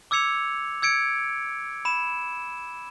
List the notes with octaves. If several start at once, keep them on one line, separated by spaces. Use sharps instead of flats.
D6 E6 G#6 C#7 F7
E6 G#6 C#7 D7
B5 E7